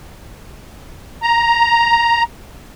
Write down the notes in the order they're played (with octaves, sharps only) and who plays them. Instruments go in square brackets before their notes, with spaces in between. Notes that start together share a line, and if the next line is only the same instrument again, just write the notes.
[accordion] A#5